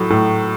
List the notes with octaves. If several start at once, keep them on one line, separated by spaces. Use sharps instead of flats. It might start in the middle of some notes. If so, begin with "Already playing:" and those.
Already playing: A2 F#3
A2